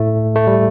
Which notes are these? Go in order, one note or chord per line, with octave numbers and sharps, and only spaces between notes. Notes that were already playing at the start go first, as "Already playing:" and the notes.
Already playing: A2 A3
A3
G3